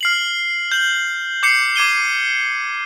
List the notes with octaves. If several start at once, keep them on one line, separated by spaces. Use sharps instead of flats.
F6 C7 F#7
G6 F#7
D6 G6 C7 C#7
D6 G#6 D#7 G7